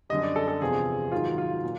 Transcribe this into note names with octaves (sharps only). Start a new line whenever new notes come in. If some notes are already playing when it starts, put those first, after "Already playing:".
F#2 D3 G3 D#5
D5
A4
A4
E2 C3 F3 G#4
G#2 D#3 F#3 F4
F4
A#2